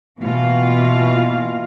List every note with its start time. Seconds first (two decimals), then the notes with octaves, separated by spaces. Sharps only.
0.20 B2 E3 A#3 F4 F5